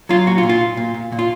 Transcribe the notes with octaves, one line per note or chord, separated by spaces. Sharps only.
F#3 F4
A#2 F#4
F4
A#2
F4
A#2
A#2
A#2
A#2
F4